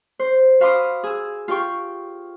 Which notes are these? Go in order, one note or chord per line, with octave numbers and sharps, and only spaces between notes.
C5
F#4 F5 B5 C6 D6 D#6
G#4 E6
F4 G4 G5 C#6